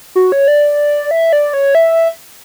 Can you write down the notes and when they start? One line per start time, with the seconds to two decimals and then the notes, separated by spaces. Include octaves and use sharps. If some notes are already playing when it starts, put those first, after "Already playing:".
0.16 F#4
0.32 C#5
0.48 D5
1.11 E5
1.33 D5
1.53 C#5
1.75 E5